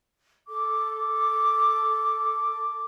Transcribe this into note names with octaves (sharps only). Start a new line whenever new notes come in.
A4 D6